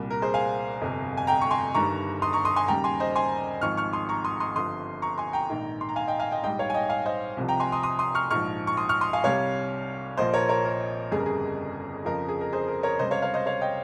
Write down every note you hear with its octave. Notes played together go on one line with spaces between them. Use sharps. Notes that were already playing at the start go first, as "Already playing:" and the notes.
Already playing: C2 A#2 G3
A#4
G#4 C5
F5 G#5
G1 F2 C3
G#5
G5 A#5
C#6
G#5 C6
G1 G2 D#3 G3 A#5 C#6
C6 D#6
A#5 C#6
C6 D#6
G#5 C6
D#2 C#3 G3 G5 A#5
G#5 C6
C5 D#5
G#5 C6
G#1 G#2 F3 C#6 F6
C#6 F6
C6 D#6
A#5 C#6
C6 D#6
C6 D#6
G1 G2 F3 C6 D#6
A#5 C#6
G#5 C6
G5 A#5
A#1 G#2 D#3
C6
A#5
F5 G#5
D#5 G5
F5 G#5
D#5 G5
A#1 G#2 G3 D#5 G5
C#5 F5
G#5
D#5 G5
F5 G#5
C5 D#5
C2 C3 F3
G5 A#5
G#5 C6
C6 D#6
C6 D#6
C6 D#6
C#6 F6
A#1 G#2 F3 C#6 F6
C#6
C6 D#6
C#6 F6
C6 D#6
F5 G#5
C2 C3 G3 C#5 F5
A#1 A#2 F3 C5 D#5
A#4 C#5
A#4 C#5
A#4
G1 F2 C#3 G3 G#4
A#4
G#4
F2 C#3 F3 A#4
G#4
A#4
G#4 C5
A#4
A#4 C#5
C#2 C3 G3 C5 D#5
C#5 F5
C#5 F5
C5 D#5
C#5 F5
D#5 G5